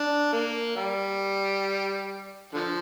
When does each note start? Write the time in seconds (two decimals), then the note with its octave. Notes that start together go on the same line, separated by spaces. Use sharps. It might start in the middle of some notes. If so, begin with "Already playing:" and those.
Already playing: D4
0.33 A#3
0.76 G3
2.53 D3 F3